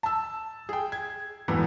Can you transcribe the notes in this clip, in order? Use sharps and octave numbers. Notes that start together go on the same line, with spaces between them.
A5 E6
G#4 G5
G#6
E1 A2 E3 B3